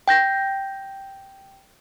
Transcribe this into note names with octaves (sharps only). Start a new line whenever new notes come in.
G5 G6 A#6